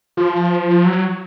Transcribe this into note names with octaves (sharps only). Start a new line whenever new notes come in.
F3
F#3